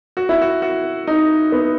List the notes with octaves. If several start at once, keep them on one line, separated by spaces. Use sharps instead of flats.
F#4
E4
F#4
F#4
D#4
B3